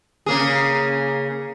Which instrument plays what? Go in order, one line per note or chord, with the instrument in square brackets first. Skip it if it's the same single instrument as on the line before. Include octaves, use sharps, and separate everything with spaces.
[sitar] C#3 A#3 G#4